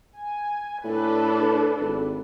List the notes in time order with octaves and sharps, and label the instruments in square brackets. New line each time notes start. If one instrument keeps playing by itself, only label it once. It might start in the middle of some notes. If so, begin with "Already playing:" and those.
[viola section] G#5
[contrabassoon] A2 [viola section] D4 A4 B4
[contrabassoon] G#1